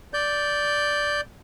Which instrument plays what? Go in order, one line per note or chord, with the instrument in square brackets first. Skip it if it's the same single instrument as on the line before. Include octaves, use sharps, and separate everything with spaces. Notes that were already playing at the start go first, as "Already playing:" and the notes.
[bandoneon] D5 G6